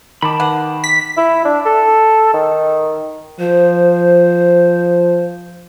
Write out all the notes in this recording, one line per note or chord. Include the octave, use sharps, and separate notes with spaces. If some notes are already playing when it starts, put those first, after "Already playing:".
D#3 A5 B5 D6
G#4 B4 F#5
B6
E4
D4
A4
D#3
F3 C5